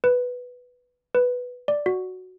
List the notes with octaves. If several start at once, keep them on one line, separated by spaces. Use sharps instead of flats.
B4
B4
D5
F#4